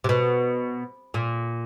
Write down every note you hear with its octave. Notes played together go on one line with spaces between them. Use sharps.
C3
B2
A#2